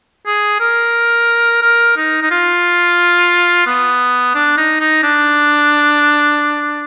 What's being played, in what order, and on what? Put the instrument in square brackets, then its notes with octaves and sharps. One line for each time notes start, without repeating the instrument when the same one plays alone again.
[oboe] G#4
A#4
A#4
D#4
D#4
F4
B3
D4
D#4
D#4
D4